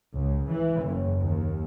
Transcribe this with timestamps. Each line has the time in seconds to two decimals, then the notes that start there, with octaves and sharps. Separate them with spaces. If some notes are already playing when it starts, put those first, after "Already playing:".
0.17 C#2
0.50 E3
0.82 F#1
1.20 D#2